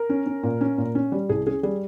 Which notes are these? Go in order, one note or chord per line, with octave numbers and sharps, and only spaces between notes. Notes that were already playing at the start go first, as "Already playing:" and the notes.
Already playing: A#4
C#4
C#4
A#2
C#4
A#2
C#4
G3
C2 G#4
C#4 G#4
G3 G#4